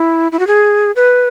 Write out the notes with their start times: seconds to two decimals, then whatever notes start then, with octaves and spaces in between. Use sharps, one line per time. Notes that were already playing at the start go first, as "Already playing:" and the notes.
Already playing: E4
0.32 E4
0.39 F#4
0.47 G#4
0.96 B4